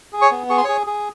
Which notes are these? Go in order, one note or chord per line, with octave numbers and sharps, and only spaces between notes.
G#4
C#5 C#6
B3
G#4 C#6
C6
G#4 C#5 C#6
G#4